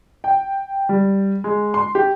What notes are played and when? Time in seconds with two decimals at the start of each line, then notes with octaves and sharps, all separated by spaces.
0.24 G5
0.89 G3
1.44 G#3
1.74 C6
1.95 G4